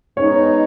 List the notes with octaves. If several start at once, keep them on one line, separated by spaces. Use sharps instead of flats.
G#3 B3 C#4 D#4 C#5